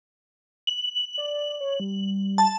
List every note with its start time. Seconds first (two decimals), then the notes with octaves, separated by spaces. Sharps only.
0.67 F#7
1.18 D5
1.61 C#5
1.80 G3
2.38 A5